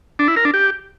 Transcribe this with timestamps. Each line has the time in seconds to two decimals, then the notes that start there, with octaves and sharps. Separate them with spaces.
0.19 D4
0.28 E4
0.36 A#4
0.45 D4
0.54 G4